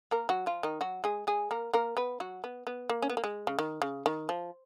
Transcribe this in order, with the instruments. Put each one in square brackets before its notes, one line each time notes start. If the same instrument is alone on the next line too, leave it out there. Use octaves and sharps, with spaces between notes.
[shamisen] A#3 A#4
F#3 F#4
F3 F4
D#3 D#4
F#3 F#4
G#3 G#4
G#3 G#4
A#3 A#4
A#3 A#4
B3 B4
F#3 F#4
B3
B3
A#3
C#4
B3
A#3
G#3
C#3
D#3
C#3
D#3
F3